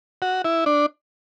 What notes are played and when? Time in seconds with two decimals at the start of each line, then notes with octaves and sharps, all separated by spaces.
0.22 F#4
0.44 E4
0.66 D4